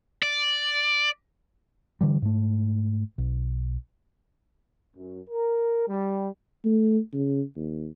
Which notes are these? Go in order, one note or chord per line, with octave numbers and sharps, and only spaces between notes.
D5
D3 E3 G3
G#2 A3
B1
F#2
A#4
G3
A3
C#3
D#2